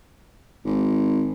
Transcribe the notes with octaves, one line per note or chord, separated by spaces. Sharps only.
G#1